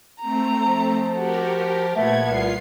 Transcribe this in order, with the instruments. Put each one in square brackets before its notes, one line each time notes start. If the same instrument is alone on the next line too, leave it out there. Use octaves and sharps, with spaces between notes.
[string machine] A3 C4 [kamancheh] A#5
[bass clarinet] F3
[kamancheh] F#4 [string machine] G4 A#4
[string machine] A#2 G#6 [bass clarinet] A3 [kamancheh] B3
[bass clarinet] C2 [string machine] F4 C7